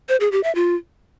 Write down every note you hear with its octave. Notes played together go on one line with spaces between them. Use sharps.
C5
G#4
G4
E5
F4